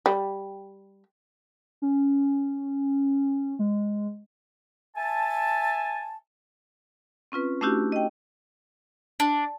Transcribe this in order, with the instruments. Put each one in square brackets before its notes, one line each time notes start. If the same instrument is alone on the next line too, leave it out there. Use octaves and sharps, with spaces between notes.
[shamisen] G3
[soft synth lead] C#4
G#3
[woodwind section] E5 G#5 A5
[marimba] C4 C#4 F4 B4
A3 C#4 D4 E4 F#4 G4
D#5 G5
[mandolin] D4